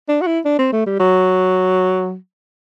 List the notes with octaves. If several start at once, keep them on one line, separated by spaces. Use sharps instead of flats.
D4
F#4
E4
D4
C4
A3
G3
F#3